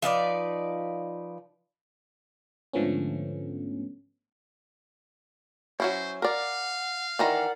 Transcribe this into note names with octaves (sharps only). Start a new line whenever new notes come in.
F3 D#4 B4 D5
G#2 D3 F3 A3 B3 C#4
F#3 C#4 E4 C5
A#4 D5 F5 F#5
D#3 E3 A#4 D5 F#5 A#5